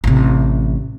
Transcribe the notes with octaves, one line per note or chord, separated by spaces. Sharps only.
A1 C3